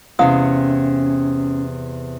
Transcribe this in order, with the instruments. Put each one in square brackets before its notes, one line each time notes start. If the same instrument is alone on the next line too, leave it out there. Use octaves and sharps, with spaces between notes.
[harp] E2 C3 [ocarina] C#4 [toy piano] F5 D#6